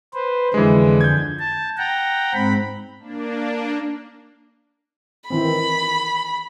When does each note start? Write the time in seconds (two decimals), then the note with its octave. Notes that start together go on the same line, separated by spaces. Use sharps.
0.14 B4 C5
0.54 F2 D3 E3 G#3
1.01 G6 G#6
1.40 A5
1.78 F#5 G5 A#5
2.34 G#2 C4 B5
3.00 A#3 D4
5.30 D#3 E3 C4 B5